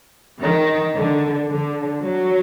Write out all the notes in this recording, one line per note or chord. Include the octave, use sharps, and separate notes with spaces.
D#3
D3
D3
F#3